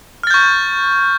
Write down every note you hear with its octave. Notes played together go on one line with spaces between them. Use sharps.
C#6 F6 G6 A6